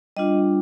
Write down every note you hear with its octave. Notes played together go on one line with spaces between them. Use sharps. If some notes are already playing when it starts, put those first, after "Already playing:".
G3 D4 F4 D#5